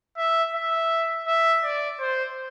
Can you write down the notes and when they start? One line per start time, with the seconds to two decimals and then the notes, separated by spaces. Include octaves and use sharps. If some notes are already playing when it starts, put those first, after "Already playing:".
0.17 E5
0.54 E5
1.27 E5
1.63 D5
2.00 C5